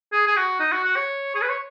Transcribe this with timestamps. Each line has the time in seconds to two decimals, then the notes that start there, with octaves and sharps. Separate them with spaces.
0.13 G#4
0.27 G#4
0.36 F#4
0.60 D#4
0.72 F#4
0.84 F#4
0.96 C#5
1.35 G#4
1.42 B4
1.49 C#5